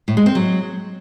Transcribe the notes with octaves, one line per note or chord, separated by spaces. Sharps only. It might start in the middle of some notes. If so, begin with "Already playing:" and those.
A2
G#3
C4
F#3